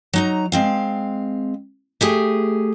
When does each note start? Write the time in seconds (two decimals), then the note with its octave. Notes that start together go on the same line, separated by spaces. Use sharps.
0.13 F#3 D#4 A#5
0.52 G#3 C4 F5
2.01 A3 G4 G#4